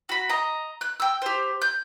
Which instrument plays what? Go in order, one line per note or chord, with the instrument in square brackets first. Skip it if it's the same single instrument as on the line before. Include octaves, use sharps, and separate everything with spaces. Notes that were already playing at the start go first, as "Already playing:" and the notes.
[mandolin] F#4 B5
D#5 A#5
F#6
G5 E6
G4 C5
G6